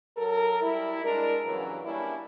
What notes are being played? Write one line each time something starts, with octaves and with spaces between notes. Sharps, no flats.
F#3 A4 A#4
G3 E4
G#3 D4 A#4
G2 C#3 E3 F#3
G3 A#3 C#4 D4 E4